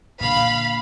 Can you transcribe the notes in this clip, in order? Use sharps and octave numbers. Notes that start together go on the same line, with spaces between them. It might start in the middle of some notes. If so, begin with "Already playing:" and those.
A#2 D3 F5 B5